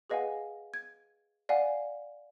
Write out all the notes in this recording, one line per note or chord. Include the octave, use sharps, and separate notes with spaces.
G#4 B4 D#5 F5 F#5 G#5
G#6
D5 F5 F#5 G#5